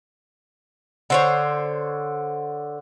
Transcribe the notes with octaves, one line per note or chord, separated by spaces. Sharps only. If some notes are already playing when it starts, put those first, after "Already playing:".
D3 C5 C#5